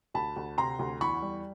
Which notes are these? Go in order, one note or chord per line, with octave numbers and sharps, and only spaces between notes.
D2 A5 B5
D2
C3 A#5 C6
D2
E2 B5 C#6
G3